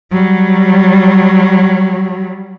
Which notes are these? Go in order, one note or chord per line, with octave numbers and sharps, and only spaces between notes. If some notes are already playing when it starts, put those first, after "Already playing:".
F#3 G3